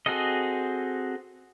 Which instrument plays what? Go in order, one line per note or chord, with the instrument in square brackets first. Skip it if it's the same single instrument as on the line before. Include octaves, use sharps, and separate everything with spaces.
[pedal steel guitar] C4 F#4 G#4 A4 D#5